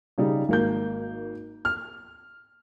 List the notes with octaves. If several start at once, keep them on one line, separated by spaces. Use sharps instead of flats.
C#3 G3 D#4
G#1 A#3 G6
F6